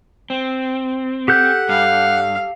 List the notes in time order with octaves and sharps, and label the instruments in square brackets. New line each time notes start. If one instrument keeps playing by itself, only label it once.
[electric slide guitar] C4
[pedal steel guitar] G4 A4 G6 [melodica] F#5
[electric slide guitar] G2 [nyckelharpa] F5